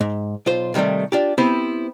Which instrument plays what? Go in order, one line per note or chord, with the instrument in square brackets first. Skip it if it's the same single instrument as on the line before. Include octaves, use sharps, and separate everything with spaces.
[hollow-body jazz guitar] G#2
B1 F4 C5
C3 D#3 E3 G3 A3
D4 F4 G4
B3 C4 E4 G4 C5